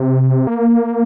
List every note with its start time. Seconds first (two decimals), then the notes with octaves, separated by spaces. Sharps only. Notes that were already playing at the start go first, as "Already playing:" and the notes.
Already playing: C3
0.47 A#3